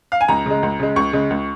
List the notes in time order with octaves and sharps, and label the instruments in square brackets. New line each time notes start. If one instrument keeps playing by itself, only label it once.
[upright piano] F5
G#5
C#2 A#5
C#3 G#3
C#2
C#3 G#3
C#2 C#6
C#3 G#3
C#2